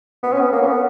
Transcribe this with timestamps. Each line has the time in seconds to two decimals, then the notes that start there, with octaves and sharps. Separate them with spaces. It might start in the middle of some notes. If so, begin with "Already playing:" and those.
0.23 B3
0.33 C#4
0.42 B3
0.52 A#3
0.61 C#4
0.66 B3